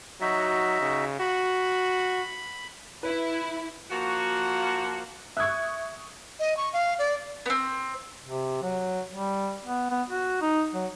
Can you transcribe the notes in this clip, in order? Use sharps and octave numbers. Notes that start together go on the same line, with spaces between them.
F#3 D#4 F#4 E5
C#3
F#4 B5
E4 B4
F3 A#3 F#4
E5 C#6 D#6 F#6 G#6
D#5
C#6
F5
D5
B3 C4
C3
F#3
G3
B3
B3
F#4
D#4
F#3